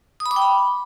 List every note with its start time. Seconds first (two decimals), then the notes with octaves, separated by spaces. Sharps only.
0.20 D#6
0.26 B5
0.31 D6
0.36 G5
0.42 B5